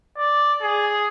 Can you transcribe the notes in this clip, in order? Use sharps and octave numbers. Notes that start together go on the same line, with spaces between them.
D5
G#4